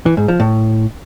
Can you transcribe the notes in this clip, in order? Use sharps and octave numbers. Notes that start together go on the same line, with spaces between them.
E3
G#2
F3
A2